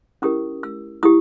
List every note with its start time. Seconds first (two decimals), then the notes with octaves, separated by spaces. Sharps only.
0.22 C#4 E4 G4 A#4 D#6
0.63 E6
1.03 E4 G4 D#6